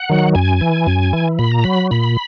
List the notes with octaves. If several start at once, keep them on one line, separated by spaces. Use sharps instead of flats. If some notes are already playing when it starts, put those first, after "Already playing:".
Already playing: F#5
D#3 F#3
F#2 G#5
E3
F#2
E3
A#2 B5
A#5
F#3 B5
A#2 B5